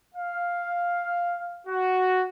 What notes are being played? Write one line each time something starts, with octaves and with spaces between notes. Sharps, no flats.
F5
F#4